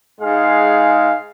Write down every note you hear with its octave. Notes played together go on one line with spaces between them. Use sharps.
G#2 G#3 G#4 F5